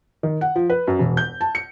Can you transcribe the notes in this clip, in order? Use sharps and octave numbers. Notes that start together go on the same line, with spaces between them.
D#3
F#5
F3
B4
F#2
E1
G6
A5
C#7